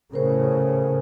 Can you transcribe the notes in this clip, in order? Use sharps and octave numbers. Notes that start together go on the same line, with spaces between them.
A2 C#3 A#4 C5